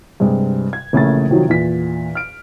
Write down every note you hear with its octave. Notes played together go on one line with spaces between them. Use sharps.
G2 C3 G#3
G#6
A#1 C#3 E3 A3 A#3 A6
C3 D#3 F3 F#3
E2 A#2 B6
F6 D7